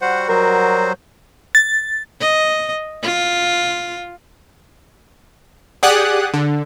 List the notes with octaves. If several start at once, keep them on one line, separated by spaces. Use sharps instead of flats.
G3 F#4 C5 F#5
F#3 A#4 C5
A6
D#5
F4
G4 G#4 D5 F#5 D#6 F#6
D3